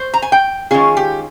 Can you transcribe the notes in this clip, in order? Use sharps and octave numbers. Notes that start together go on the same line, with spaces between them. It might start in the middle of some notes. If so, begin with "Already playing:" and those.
Already playing: C5
A#5
G#5
G5
D#3 G#3 C#4 F4 G#4
G4